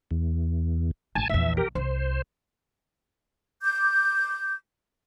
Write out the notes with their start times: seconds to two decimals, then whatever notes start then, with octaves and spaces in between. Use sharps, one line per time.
0.11 E2
1.15 A1 G#5 A5
1.30 A#1 E2 E5
1.57 G4 A#4
1.75 C2 C5
3.63 D6 G6